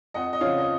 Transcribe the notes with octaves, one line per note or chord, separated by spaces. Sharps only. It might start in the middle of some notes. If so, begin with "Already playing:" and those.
F2 D#5 F#5
D#5
C#3 F3 C#5 F5
D#5